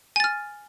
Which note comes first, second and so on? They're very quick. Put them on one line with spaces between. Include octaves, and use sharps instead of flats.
G#5 A6 F6